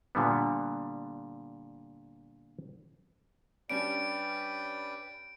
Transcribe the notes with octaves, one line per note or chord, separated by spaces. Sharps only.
A#2 D3 G3 B3
G3 C#4 D4 B4 D5 G5 D7